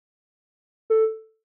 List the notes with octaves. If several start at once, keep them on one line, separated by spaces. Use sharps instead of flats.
A4